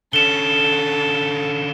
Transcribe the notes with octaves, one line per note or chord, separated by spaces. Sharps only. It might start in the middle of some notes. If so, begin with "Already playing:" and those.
D3 C#4 A4 E7 G7